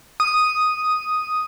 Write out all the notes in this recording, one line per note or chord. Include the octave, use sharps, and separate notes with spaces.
D#6